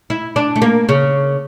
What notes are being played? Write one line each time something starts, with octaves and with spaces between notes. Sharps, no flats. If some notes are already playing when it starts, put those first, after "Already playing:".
E4
D4
A3
A#3
C#3